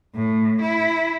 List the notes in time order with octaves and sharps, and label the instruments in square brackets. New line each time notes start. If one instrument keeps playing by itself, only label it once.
[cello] A2
E4